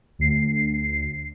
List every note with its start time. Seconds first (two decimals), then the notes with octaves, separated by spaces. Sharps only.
0.19 D2 C7